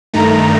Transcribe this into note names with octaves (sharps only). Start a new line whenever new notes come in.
G2 D#3 A3 A#5